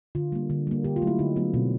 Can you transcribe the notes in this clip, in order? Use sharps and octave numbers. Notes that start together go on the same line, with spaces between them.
D3 F4
G3 A#3
D3
G3 A#3
D3 G4
F4
F#3 A3
E4
D3 D#4
F#3 A3 B3
B2 C4